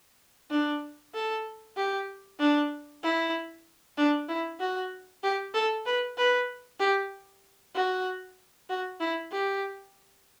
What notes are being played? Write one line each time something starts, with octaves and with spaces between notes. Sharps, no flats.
D4
A4
G4
D4
E4
D4
E4
F#4
G4
A4
B4
B4
G4
F#4
F#4
E4
G4